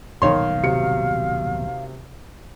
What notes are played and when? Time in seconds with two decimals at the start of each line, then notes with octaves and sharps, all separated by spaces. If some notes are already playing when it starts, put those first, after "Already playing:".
0.22 D#1 B1 G#2 D#3 C#5 F5 C6
0.63 C3 F#4 C#7